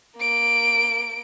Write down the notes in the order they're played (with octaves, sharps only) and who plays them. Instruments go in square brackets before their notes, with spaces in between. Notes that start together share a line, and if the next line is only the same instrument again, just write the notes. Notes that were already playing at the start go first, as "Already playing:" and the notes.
[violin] A#3 D7